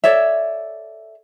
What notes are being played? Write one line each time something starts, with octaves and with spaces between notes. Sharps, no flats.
A4 C#5 D5 E5